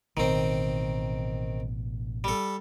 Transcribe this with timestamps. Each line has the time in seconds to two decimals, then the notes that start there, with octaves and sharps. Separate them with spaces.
0.17 A1 B2 D#3 C4
2.24 G3 A4